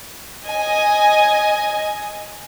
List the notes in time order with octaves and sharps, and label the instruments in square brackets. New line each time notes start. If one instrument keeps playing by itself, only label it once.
[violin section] D#5 G#5